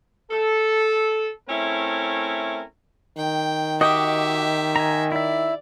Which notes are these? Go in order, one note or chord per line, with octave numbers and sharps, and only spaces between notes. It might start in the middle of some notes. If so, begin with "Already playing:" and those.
A4
A3 C4 C#4 E4 A#4
D#3 G5
F#4 G4 D#5 E5 G5 D6
G#5 A#5
E4 D5 E5